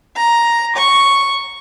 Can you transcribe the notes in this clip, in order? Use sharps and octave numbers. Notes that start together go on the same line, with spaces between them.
A#5
C#6